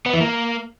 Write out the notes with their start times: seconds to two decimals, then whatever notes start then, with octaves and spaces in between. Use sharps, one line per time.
0.06 B3
0.13 E3
0.20 A#3